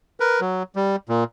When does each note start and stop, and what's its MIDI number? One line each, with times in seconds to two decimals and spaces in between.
0.20 0.40 70
0.20 0.40 71
0.41 0.63 54
0.76 0.96 55
1.09 1.24 46